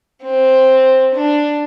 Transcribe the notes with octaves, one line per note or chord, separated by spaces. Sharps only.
C4
D4